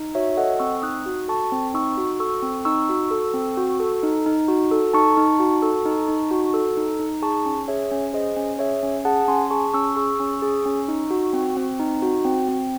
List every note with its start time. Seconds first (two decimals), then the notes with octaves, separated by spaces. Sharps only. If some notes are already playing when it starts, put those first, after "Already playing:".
Already playing: D#4
0.15 F#4 C#5 E5
0.37 A4 D#5 F#5
0.59 C4 C#6 E6
0.82 D#4 D#6 F#6
1.06 F#4
1.28 A4 A5 C#6
1.52 C4
1.74 D#4 C#6 E6
1.97 F#4
2.20 A4 C#6 E6
2.43 C4
2.65 D#4 C#6 E6
2.89 F#4
3.11 A4
3.34 C4
3.57 F#4
3.80 A4
4.03 D#4
4.26 D#4
4.48 F#4
4.71 A4
4.94 D#4 A5 C#6
5.17 D#4
5.39 F#4
5.62 A4
5.86 D#4
6.08 D#4
6.31 F#4
6.54 A4
6.77 D#4
7.00 D#4
7.22 G#4 A5 C#6
7.46 C#4
7.68 G#4 C#5 E5
7.91 C#4
8.13 G#4 C5 D#5
8.36 C#4
8.59 G#4 C#5 E5
8.83 C#4
9.05 G#4 F#5 A5
9.28 C#4 G#5 C6
9.51 G#4 A5 C#6
9.74 C#4 C#6 E6
9.96 G#4 C#6 E6
10.20 C#4
10.42 G#4
10.66 C#4
10.88 D#4
11.11 F#4
11.33 C4
11.57 C4
11.79 D#4
12.02 F#4
12.25 C4
12.49 C4